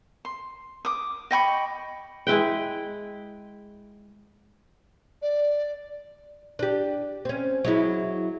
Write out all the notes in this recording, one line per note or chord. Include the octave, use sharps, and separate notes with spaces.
C6
D6 D#6
D#5 G5 B5 C#6
G#3 E4 B4 G5
D5
D4 G4
C4 C#4
F#3 G#3 E4